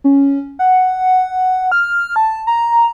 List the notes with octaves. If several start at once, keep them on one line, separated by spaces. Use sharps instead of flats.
C#4
F#5
F6
A5
A#5